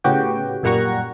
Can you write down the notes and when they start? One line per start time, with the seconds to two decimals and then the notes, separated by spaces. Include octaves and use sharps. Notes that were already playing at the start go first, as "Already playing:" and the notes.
0.04 A2 C#3 B3 F#4 G4 G5
0.63 F#2 A#2 G3 F#5 A#5 C#6